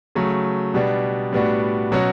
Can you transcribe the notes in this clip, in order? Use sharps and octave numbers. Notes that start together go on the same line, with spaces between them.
C#3 F#3 A3
B2 G3 B3 D4
A2 G3 B3 D4 F#4
B2 F#3 C#4 F#4